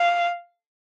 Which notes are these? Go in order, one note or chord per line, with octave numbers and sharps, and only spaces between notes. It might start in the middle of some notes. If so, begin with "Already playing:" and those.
Already playing: F5